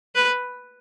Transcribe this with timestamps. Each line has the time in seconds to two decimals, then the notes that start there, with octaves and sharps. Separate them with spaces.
0.15 B4